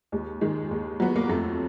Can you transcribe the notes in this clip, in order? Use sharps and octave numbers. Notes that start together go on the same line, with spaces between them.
D#2 G#3
D#3 G#3
D#2
F#3 B3
A#3
F2 A3